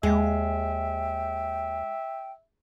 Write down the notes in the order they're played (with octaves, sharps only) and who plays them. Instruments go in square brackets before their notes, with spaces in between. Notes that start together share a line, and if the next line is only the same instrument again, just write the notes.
[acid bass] D#2 [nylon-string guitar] G#3 [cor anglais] E5 [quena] G5